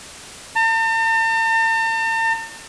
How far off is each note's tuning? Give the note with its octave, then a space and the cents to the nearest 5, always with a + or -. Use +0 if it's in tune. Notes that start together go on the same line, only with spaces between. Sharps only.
A5 +45